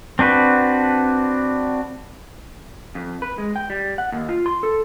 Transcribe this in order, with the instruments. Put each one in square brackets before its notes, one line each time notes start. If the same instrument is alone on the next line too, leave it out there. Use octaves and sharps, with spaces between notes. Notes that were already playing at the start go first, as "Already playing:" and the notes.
[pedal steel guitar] C4 D4 F#4 B4
[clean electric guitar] F2
B4
G#3
G5
G3
F#5
D#2
F4
C6
A4